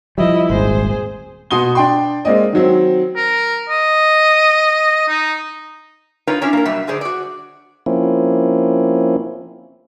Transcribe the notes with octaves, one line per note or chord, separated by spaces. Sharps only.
F3 G3 E4 D#5
D#1 G#1 G#4 C5
B2 F#4 C6 D#6 G7
D4 G5 C6
G#3 A#3 C4 D5 D#5
D#3 F#3 C4
A#4
D#5
D#4
D#4 F4 A#4 B4 C#5
C#4 D4 E4 A#4 C#5
A#3 A#4
B2 F#3 G3 E5
G#2 D3 G#4 C5 D5
F#4 D5
F3 A#3 C4 C#4 E4